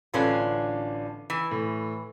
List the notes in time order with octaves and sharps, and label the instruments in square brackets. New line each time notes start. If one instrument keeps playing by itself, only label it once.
[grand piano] A1 D3 B4 [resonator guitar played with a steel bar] C#4 D4 F4
[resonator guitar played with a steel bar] E3
[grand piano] A2